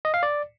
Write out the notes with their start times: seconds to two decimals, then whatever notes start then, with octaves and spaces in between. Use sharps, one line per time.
0.05 D#5
0.14 F5
0.23 D5